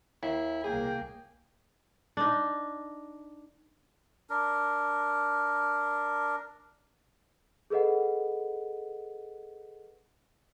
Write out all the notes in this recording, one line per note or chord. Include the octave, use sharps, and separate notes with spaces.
D#2 E4
C2 A#3 G#4 G5
D4 D#4
D4 A#4
G#4 A4 B4 D#5 F#5